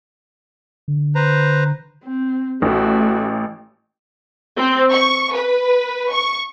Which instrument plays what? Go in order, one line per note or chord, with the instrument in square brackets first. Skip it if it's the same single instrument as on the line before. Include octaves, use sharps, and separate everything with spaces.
[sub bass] D3
[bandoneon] B4 C5 A#5
[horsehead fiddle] C4
[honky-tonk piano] A1 [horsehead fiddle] A3 F#4
[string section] C4
C#6
B4
C#6